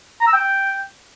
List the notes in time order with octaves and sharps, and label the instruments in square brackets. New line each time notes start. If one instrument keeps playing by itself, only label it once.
[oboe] A#5
E6
G5